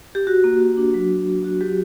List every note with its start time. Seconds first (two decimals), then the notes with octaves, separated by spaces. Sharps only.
0.15 G4
0.27 F#4
0.44 A#3
0.60 F#4
0.77 D4
0.94 F#3
1.11 F#3
1.27 F#4
1.44 F#4
1.61 F#3 G4